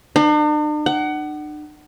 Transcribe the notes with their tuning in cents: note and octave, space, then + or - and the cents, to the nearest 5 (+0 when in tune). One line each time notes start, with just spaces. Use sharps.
D4 +45
F#5 +25